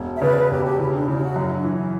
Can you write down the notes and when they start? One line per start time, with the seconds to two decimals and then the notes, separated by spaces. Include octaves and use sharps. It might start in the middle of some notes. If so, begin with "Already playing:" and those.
Already playing: E1
0.17 E5
0.21 C#3 B4 D5
0.36 B4
0.51 E1 G4
0.65 G4
0.79 C#3 E4
0.93 D4
1.08 C#3 E4
1.17 G4
1.22 F#4
1.36 F#2 E4
1.55 D4
1.64 E3
1.75 E4